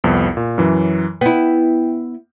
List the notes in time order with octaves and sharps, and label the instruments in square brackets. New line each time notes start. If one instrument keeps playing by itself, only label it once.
[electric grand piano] C2 F2 B3
A#2
F#2 E3 F#3
[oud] B3 E4 [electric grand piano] G5